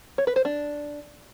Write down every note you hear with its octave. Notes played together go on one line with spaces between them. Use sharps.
C#5
B4
C5
D4